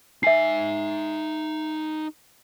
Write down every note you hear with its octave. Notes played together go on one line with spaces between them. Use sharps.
D#4 E5 G#5 C7